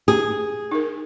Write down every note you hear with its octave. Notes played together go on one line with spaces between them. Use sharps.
G4 G#4
D#4 A#4